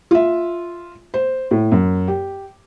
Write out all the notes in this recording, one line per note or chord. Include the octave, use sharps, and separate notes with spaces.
F4 E5
C5
A2
F#2
G4